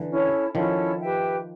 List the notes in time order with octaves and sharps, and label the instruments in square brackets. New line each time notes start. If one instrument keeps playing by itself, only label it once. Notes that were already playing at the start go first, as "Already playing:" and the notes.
Already playing: [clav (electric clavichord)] D3 E3
[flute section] C#4 E4 A4 C#5
[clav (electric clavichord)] D#3 F3 [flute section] C#4 E4 A4 C#5
[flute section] G4 B4 E5 G5